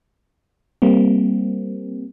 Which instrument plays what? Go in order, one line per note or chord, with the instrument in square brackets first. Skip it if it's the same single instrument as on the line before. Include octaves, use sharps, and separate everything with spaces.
[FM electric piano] G3 A#3 C4